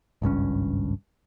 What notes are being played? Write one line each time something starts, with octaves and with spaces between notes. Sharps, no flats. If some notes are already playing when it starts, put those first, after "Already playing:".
G#1 C#2 G2 C#4